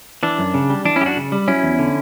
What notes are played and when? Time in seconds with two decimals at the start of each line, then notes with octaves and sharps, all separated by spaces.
0.23 E3 D4
0.39 F#2
0.54 C#3
0.70 G3
0.85 E3 D4
0.96 C#4 E4
1.01 F#2 G4
1.06 D4 F#4
1.17 C#3
1.32 G3
1.48 F#3 C#4 E4
1.63 E2
1.79 D3